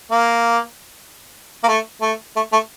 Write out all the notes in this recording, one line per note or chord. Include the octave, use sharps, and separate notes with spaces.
A#3
A#3
A3
A3
A3
A3